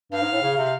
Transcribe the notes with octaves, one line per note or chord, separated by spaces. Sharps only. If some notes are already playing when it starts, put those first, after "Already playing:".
G2 F5
G#2
A2
C#3
C3